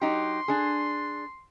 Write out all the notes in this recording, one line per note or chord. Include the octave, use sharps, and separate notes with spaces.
F#3 D#4 G4 C6
D4 G#4